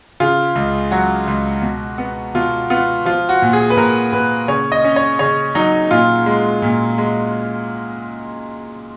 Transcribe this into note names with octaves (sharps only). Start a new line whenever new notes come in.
C#3 F4
C#2
F#3 F#4
C#2
B2
B3
B2 F4
B3 F4
F3 F4
F#4
A#2
G#4
B4
A#2 A#4
A#2 B4
C#3 C#5
D#5
C#4
C#5
C#3 C#5
F#3 D#4
A#2 F4
G#3
A#2
G#3